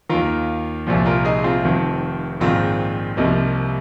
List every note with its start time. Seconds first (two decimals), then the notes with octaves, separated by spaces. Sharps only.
0.09 D#2 D#3 F4 A#4
0.87 C2 A#2 F3
1.05 F4 A#4
1.25 D#4 G#4
1.44 C4 F4
1.64 F1 F2 D#3
2.40 A#1 G#2 D#3 C4 F4
3.17 C2 C3 F3 A#3 D#4